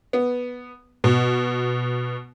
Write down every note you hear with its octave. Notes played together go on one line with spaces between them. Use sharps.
B3
B2